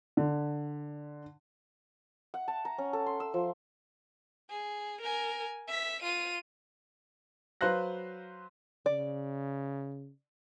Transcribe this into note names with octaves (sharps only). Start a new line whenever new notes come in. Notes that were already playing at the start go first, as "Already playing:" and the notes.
D3
F#5
A5
A#5
C#4
A4
C6
E6
F3
G#4
A#4 G#5
E5 B6
F4 D#7
F#3 B4 C5 F5 F#6 A#6
C#3 D5